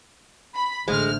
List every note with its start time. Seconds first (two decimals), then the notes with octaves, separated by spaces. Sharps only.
0.55 B5
0.88 A1 D3 G#3 A3 C5 F6